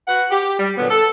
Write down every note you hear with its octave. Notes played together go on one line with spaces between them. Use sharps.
F#4 B4 F#5
G4
G3
A#2 D3 F#3 B3
A4